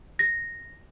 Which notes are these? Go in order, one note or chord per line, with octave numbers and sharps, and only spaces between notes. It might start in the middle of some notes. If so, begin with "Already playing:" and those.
A#6